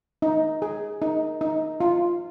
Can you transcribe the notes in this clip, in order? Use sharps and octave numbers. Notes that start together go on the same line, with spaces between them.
D#4
G#4
D#4
D#4
F4